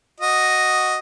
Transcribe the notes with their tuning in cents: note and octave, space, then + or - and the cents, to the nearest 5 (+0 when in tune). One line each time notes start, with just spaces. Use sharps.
F#4 +0 D#5 +0